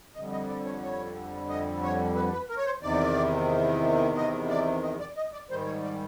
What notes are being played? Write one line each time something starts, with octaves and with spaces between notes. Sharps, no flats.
F2 D3 G3 D#5
D#5
D5
C#5
C#5
D#5
C#5
B4
B4
A#4
C#5
C5
E2 C3 D#3 D5
D#5
D5
D#5
D5
D#5
D5
G#2 D#3 G3 C5
C#5
D5